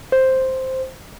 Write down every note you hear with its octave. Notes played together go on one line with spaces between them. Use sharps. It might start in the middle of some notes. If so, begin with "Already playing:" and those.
C5